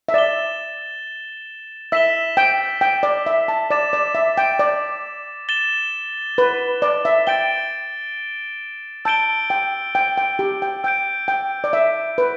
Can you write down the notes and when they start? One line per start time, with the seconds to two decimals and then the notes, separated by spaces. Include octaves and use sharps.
0.09 E5
0.14 D5 A6 E7 G7
1.92 E5 E6 B6 E7 G7
2.37 G5
2.81 G5
3.03 D5
3.26 E5
3.48 A5
3.70 D5 D6 A6 E7
3.93 D5
4.15 E5
4.38 G5
4.59 D5
5.49 A6 E7 G7
6.38 B4
6.82 D5
7.05 E5
7.27 G5 A6 D7 G7
9.05 A5 E6 G6 D7 G7
9.50 G5
9.95 G5
10.17 G5
10.39 G4
10.62 G5
10.84 G5 E6 G6 D7
11.28 G5
11.64 D5
11.73 E5
12.18 B4